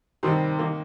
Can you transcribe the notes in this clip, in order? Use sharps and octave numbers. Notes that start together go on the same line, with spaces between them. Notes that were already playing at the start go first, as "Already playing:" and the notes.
C3 D#3 G3 C4 C6
D#3 A#3